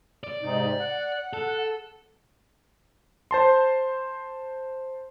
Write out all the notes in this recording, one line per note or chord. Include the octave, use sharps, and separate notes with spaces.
D5
G#2 C3 D#4
F#5 F#6
A4
C5 A5 C6